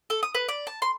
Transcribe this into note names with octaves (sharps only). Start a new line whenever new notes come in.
A4
D#6
B4
D5
A5
C6